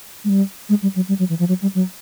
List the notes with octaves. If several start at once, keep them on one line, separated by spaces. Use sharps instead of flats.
G#3
G3
G#3
G3
F#3
G3
F#3
E3
F3
F#3
G3
F#3